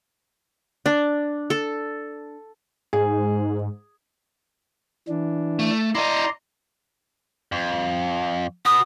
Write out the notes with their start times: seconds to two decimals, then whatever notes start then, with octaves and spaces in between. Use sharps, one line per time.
0.86 D4
1.50 A4
2.93 G#2 G#4
5.08 E3 D4
5.59 A3
5.95 E4 D5 D#5 A#5 C6
7.52 F2
8.66 F#4 B4 D#6